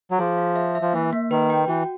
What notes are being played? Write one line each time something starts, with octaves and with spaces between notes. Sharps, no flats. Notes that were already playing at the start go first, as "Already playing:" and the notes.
F#3
F3 G#4
F5
E5
E5
F3
E3 A#3
A#3
D#3 B4
G5
E3 F#4